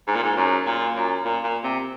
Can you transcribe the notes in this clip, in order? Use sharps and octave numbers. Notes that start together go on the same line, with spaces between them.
G#2
A#2
G#2
F#2
A#2
F#2
A#2
A#2
C3